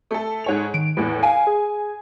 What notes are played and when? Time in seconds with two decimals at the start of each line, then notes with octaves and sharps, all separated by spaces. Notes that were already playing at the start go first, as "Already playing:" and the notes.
0.11 A3 A4
0.44 G#2 C#5 F7
0.74 D#3 D7
0.97 E2 A2 B4
1.23 F5 G#5
1.47 G#4